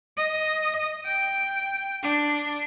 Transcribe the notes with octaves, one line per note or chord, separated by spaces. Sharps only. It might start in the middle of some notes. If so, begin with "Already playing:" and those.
D#5
G5
D4